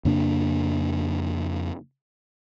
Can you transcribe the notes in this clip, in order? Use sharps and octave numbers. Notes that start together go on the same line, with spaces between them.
F2 C#3 A#3 D4